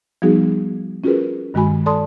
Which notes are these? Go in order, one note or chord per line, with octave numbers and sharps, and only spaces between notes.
F3 G3 B3 D#4 F#4 G#4
C#4 F4 F#4 G#4 A#4 B4
G2 D#3 G#3 F#4 G#5 B5
A4 D5 A5 C6 D#6